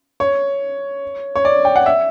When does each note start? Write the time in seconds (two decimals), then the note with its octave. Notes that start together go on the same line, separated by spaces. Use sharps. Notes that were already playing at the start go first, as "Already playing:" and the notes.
0.20 C#5
1.35 C#5
1.45 D5
1.65 G5
1.76 F#5
1.86 E5